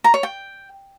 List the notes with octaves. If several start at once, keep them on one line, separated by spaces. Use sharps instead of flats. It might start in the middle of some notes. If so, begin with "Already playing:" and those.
A#5
C#5
G5